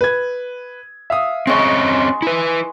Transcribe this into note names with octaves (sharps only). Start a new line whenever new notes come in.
B4 G#6
E5 F5 D#6
G#3 C4 C#4 D#5 C#6
E4 B4